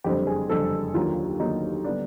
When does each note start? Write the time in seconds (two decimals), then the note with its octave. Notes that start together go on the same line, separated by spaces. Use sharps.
0.04 F#1 F2 D3 G3 C4 G4
0.27 G#4
0.49 F#1 F2 D3 G3 C4 A4
0.94 D#2 D3 F#3 A#3 F4
1.39 D#2 D3 F#3 A#3 D#4
1.84 D3 G3 B3 D4